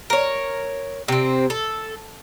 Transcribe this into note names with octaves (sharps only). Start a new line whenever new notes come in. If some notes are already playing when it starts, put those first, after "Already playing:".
A#4 C#5
C3 C4
A4